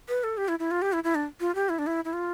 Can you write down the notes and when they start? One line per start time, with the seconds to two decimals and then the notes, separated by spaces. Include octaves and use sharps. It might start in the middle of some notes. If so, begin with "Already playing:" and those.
0.09 B4
0.24 A4
0.37 G4
0.48 E4
0.59 E4
0.71 F4
0.82 G4
0.93 E4
1.04 E4
1.15 D4
1.40 F4
1.55 G4
1.69 E4
1.79 D4
1.87 E4
2.05 E4
2.13 F4